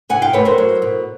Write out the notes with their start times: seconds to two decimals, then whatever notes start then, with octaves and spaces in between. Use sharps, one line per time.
0.09 C3 F#5 G#5
0.22 F5 G5
0.33 A3 B4 C#5
0.45 A#4 C5
0.58 F#3
0.82 B2